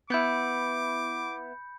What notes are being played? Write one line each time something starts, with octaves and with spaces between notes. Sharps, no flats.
B3 E4 B5 D6 G6 C#7